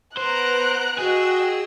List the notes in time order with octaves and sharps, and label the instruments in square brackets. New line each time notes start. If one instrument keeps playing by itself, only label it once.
[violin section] B3 A#5 D7 [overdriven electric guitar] C5 [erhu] F#6
[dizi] F#4 [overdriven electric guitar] G#4 [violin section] D#5 G5 E6